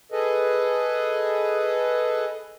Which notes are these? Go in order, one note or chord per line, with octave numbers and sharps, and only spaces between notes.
G#4 A4 B4 D#5